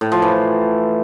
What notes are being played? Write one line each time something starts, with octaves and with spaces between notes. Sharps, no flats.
A2
F3
E3